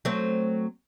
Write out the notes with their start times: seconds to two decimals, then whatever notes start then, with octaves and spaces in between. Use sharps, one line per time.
0.05 F#3 A3 C4